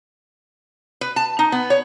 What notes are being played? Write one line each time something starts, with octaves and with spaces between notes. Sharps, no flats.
B4
A5
D#4
B3
C#5